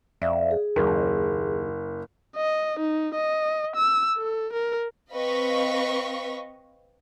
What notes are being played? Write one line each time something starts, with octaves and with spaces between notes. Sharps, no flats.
F2 D5 E5 F5
G#4
F#1 D#2
D#5
D#4
D#5
E6
A4
A#4
C4 B4 D#5 F5 C#6 B6